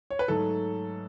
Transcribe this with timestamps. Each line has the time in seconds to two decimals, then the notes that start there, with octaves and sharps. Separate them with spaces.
0.10 C#5
0.19 B4
0.28 G#2 F#3 A3 A4